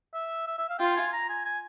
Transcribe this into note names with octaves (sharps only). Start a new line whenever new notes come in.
E5
E5
E5
F5
F4 G5
G#5
A#5
G#5
G#5